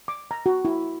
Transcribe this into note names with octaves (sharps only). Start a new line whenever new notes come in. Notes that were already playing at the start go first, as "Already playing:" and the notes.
D6
A#5
F#4
E4